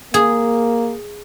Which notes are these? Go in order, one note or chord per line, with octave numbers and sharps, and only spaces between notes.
A#3 G#4